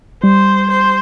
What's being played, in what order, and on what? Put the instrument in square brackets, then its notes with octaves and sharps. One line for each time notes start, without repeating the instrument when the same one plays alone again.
[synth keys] G3 [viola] C5
[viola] C5